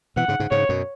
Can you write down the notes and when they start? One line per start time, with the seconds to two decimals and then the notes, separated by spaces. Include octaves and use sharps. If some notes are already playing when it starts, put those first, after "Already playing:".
0.16 B2 E3 F#5
0.28 G#2 C#3
0.40 G#2 C#3
0.51 G#2 C#3 C#5
0.69 F#2 B2